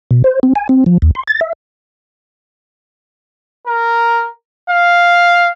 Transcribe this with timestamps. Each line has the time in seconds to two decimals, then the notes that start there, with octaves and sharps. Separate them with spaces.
0.11 B2
0.24 C5
0.43 C4
0.55 G#5
0.69 C4
0.86 F3
1.02 D#2
1.15 C6
1.28 A6
1.41 E5
3.67 A#4
4.70 F5